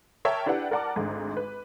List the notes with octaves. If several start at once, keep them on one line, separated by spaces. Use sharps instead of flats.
A#4 C#5 E5 G5 A5
D4 E4 G4 B4 F#5
A#4 D5 F#5 A5 D6
G#1 D2 G#2
B4